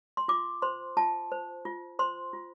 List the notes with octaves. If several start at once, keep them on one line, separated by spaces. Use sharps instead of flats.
C6
F4 D6
C5 C6
F4 A5
C5
F4
C5 C6
F4